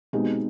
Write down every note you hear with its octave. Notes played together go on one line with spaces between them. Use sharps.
B2 G#3 C4 D#4 G4